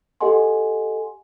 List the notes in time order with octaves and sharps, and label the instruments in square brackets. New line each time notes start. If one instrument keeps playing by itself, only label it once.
[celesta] G4 A4 D#5 F#5 G#5 C6